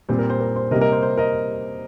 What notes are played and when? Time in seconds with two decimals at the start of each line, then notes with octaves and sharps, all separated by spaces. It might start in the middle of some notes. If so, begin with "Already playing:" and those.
0.09 A#2 G3 C4 C5
0.19 A#4
0.30 C5
0.40 A#4
0.56 C5
0.71 C3 G3 A#3 A#4 D#5
0.81 A#4 D#5
0.92 C5
1.02 C5
1.17 A#4 D#5